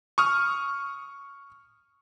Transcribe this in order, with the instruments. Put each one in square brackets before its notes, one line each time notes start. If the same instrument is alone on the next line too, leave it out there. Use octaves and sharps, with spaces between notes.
[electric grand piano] C#6 D#6 F6